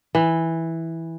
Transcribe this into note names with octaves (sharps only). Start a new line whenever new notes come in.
E3